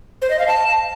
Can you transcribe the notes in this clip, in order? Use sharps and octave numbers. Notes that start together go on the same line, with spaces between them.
C5
D#5
F5
A5